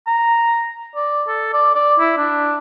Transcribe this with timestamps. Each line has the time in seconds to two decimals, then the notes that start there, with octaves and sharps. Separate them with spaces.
0.07 A#5
0.96 D5
1.27 A4
1.53 D5
1.75 D5
1.99 E4
2.17 D4